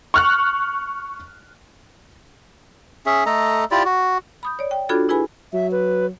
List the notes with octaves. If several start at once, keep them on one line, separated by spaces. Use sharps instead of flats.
C#6 F6 F#6
C#4 G#4 E5
A3 A4 D#5 A#5
E4 F4 G4 D5
F#4
B5 D#6 G6
C#5 D5
G5
D4 F4 F#4 A4 B5 G#6
E4 G#4 B4 G#5 B5
F#3 E5
B4